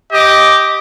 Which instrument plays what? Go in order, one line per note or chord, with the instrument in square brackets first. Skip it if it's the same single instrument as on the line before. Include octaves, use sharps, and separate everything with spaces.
[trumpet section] G4 D#5 D6